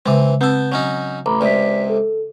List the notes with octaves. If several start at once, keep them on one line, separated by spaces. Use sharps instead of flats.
C#3 E3 G#3 C4
B3 C4 A5 E6 G6
F#3 C#4 D#4
A1 A#5 B5 D6
C#2 C3 D5 B6
A4